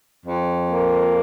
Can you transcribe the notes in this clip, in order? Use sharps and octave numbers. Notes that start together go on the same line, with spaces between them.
F2
A#3